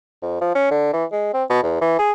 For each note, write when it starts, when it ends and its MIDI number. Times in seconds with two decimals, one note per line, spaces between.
0.22 0.41 41
0.41 0.53 53
0.55 0.69 61
0.71 0.92 50
0.93 1.05 52
1.12 1.29 56
1.34 1.44 60
1.50 1.61 47
1.63 1.78 40
1.81 1.97 52
1.99 2.12 68